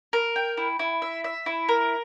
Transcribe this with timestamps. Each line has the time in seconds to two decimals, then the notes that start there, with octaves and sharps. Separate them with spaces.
0.13 A#4
0.36 G5
0.57 E4
0.79 E4
1.02 E5
1.24 E5
1.46 E4
1.69 A#4